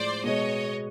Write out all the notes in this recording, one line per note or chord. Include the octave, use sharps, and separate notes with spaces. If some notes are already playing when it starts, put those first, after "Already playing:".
Already playing: A2 F3 G#3 C5 D5
B2 G#3 B3 C#5 D#5